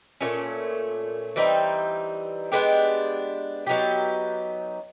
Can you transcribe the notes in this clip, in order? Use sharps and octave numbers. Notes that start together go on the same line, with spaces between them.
A#2 F#3 A3 C#4
E3 G3 C4 D#4
G#3 B3 D4 G4
F#3 B3 D#4 G4